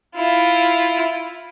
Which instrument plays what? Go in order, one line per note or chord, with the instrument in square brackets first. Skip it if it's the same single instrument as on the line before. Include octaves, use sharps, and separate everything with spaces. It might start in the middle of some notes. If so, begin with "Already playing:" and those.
[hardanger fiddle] E4 F4